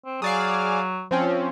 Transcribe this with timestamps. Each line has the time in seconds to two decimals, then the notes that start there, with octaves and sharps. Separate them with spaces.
0.05 C4
0.22 F#3 G#4 D5 F5
1.11 F3 C4 C#4